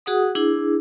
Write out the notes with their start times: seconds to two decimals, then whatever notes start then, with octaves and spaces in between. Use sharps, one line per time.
0.06 F#4 G#4 F#5 D#6
0.35 D4 E4 G#4